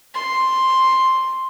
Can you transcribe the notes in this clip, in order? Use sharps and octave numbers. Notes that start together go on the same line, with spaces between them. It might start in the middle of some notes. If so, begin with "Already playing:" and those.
C6